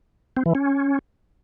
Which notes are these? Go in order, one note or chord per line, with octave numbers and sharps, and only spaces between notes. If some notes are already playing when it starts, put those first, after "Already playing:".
C4
E3
C#4